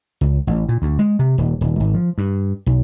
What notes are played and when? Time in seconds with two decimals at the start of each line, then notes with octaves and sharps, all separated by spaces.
0.21 C#2
0.47 A1
0.69 A#2
0.82 D2
0.99 G#3
1.19 C3
1.38 D#1
1.61 D#1
1.80 G#1
1.94 F3
2.18 G2
2.66 B1